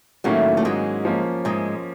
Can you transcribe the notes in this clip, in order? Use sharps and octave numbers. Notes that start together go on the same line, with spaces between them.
A2 D#3 F#3 A3 A#3 C#4 F#4
A3
G#2 G#3
F3 A#3 C#4
G#2 G#3